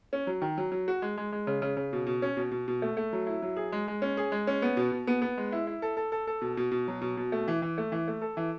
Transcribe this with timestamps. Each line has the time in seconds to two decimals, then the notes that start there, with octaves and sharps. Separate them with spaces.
0.13 C#4
0.27 F#3
0.42 D#3
0.58 F#3
0.72 F#3
0.88 F#4
1.02 G#3
1.17 G#3
1.32 G#3
1.47 C#3
1.62 C#3
1.77 C#3
1.93 B2
2.07 B2
2.22 C#4
2.37 B2
2.52 B2
2.68 B2
2.82 A3
2.97 A3
3.13 F#3
3.27 E4
3.42 F#3
3.57 G#4
3.72 G#3
3.88 G#3
4.02 C#4
4.17 G#4
4.32 G#3
4.47 C#4
4.62 B3
4.77 B2
4.92 B2
5.07 B3
5.22 B3
5.37 G#3
5.52 E4
5.67 E4
5.82 A4
5.97 A4
6.12 A4
6.27 A4
6.42 B2
6.57 B2
6.72 B2
6.88 F#3
7.01 B2
7.17 B2
7.32 A3
7.48 E3
7.62 E3
7.78 A3
7.92 E3
8.08 A3
8.21 A4
8.37 E3